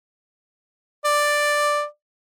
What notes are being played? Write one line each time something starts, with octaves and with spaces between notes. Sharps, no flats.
D5